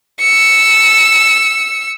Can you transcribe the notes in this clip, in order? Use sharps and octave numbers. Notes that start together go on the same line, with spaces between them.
E6 C#7